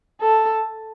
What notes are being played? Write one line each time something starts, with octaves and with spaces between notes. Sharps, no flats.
A4